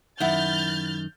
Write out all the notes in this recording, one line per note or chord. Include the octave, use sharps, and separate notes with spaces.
F#2 D#3 E4 F#5 F6 G6 A6